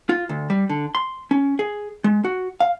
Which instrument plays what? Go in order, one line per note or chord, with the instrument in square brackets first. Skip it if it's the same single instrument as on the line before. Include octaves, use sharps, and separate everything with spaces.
[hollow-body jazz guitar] F4
D2
G3
D3
C6
C#4
G#4
G#3
F#4
F5